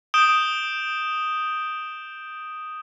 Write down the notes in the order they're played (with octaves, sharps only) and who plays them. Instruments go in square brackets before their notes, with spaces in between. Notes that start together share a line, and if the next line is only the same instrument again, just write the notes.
[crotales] D#6 G6 D7 E7 G7